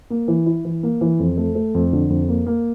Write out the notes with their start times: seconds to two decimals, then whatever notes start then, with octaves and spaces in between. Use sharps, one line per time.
0.10 A#3
0.28 E3
0.46 E4
0.65 E3
0.83 A#3
1.01 E3
1.19 F2
1.37 A3
1.55 A3
1.75 F2
1.93 D3
2.10 F2
2.29 A#3
2.46 A#3